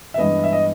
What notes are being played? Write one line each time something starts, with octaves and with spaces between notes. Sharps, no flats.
E5
G2 E3 G#3 B3 D#5
E5
D#5